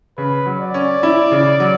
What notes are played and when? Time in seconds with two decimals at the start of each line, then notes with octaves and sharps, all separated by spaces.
0.18 C#3 B4
0.46 F#3
0.60 D5
0.74 C#4
1.03 E4
1.31 C#3
1.60 F#3